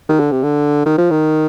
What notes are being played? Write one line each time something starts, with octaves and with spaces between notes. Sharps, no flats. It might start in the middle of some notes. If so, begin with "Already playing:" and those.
D#3
D3
C3
D3
D#3
F3
D#3